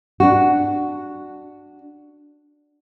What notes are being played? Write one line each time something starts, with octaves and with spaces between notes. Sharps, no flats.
D4 F#4